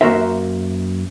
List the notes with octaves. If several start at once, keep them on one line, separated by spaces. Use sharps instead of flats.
F#2 A#3 F#4 A#4 C5 E5